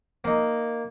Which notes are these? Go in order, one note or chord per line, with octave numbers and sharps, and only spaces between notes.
A#3 D#4